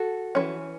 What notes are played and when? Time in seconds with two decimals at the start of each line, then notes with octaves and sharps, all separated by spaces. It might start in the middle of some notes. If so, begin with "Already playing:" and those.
Already playing: F#4 A4
0.35 E3 G#3 C#4